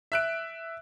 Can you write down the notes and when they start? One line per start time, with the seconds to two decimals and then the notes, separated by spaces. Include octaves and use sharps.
0.12 E5 F#6 D7